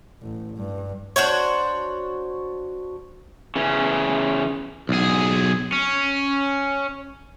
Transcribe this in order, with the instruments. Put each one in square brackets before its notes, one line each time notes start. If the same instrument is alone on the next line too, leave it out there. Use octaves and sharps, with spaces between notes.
[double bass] A1
G2
[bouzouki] D4 F#4 C5 C#5
[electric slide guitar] C#3 E3 C#4
[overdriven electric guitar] B1 G#4
C#4